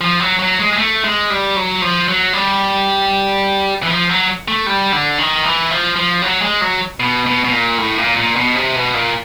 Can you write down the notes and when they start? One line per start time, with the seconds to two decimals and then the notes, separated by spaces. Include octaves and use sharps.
0.01 F3
0.20 F#3
0.39 F#3
0.59 G#3
0.73 G#3
0.78 A3
1.04 G#3
1.30 G3
1.56 F#3
1.82 F3
2.08 F#3
2.33 G3
3.83 E3
3.90 F3
4.09 F#3
4.48 A3
4.66 G3
4.92 D3
5.18 D#3
5.44 E3
5.71 F3
5.96 F3
6.22 F#3
6.42 G#3
6.61 F#3
7.00 B2
7.26 B2
7.45 B2
7.52 A#2
7.78 A2
7.98 A#2
8.17 A#2
8.36 B2
8.56 C3
8.75 B2
8.94 A#2